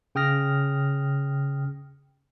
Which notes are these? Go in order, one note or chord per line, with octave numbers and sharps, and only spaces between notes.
C#3 G5 D#6 F6 A#6